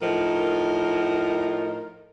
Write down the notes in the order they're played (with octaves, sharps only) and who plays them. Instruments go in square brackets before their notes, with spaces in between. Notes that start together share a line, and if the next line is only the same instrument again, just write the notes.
[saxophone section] A2 F3 D#4 A#4